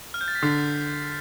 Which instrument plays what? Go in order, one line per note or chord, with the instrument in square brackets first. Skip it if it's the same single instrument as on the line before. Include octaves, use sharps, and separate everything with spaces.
[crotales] F6
G6
A6
B6
[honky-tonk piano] D3 [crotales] C7